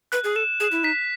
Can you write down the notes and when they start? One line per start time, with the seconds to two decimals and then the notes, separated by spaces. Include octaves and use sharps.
0.12 B4 F#6
0.24 G#4
0.36 A4 E7
0.60 G#4 E7
0.72 E4
0.83 D#4 B6